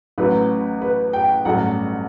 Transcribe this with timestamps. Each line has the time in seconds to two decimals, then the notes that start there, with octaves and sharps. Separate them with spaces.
0.18 A1 A2 F#3 B4
0.81 B4
1.13 G5
1.45 A1 G2 F#3 A3 F#5